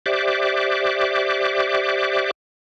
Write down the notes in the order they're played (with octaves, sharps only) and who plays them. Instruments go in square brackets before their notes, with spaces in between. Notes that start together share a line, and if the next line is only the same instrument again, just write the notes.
[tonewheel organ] G4 C5 D5 E5 D6 F#6